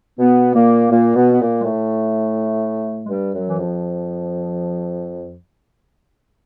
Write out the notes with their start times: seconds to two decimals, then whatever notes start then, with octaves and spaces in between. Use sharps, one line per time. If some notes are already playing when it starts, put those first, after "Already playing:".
0.19 B2 B3
0.55 A#2 A#3
0.91 A#2 A#3
1.16 B2 B3
1.33 B3
1.41 A#2 A#3
1.60 G#3
1.64 A2 A3
3.06 G#3
3.10 G2 G3
3.34 F#2 F#3
3.49 E3
3.59 F2 F3